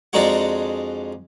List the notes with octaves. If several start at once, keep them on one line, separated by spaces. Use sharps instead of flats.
F2 G#3 D4 D#4 F#4 F#5